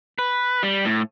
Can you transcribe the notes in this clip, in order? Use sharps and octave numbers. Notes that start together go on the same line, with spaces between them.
B4
G3
A2